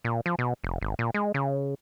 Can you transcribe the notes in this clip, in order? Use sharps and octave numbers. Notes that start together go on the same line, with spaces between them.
A#2
F3
B2
F1
G#1
A#2
G#3
C#3